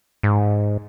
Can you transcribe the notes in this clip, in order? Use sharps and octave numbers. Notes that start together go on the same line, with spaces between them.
G#2